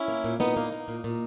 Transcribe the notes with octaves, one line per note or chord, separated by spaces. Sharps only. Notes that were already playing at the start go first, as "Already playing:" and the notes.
Already playing: C#4 E4
A#3
A#2
A#2 B3 D#4
A#3
A#3
A#2
A#2